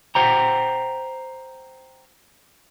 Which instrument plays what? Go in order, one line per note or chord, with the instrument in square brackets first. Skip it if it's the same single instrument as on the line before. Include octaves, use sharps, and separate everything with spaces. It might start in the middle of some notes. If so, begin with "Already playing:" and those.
[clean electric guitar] C5 F#5 G5 A#5